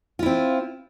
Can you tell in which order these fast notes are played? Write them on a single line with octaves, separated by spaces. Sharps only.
F4 E4 C4